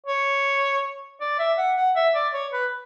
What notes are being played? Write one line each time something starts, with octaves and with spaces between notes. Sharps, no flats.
C#5
D5
E5
F#5
F#5
E5
D5
C#5
B4